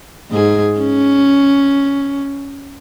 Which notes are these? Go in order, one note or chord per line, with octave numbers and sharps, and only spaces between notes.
G#2 G#4
C#4